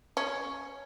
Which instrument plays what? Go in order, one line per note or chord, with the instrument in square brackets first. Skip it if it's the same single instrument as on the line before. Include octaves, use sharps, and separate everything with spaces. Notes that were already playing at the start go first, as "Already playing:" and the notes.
[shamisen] C#4